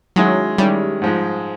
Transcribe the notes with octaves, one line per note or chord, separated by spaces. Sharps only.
D#3 F#3 G#3 C#4 E4
D#3 G3 G#3 C#4 E4
G#2 F3 G#3